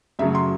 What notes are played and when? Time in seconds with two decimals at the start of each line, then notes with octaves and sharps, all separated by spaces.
0.19 F#2 C#3 F#3 A3 E5
0.35 C6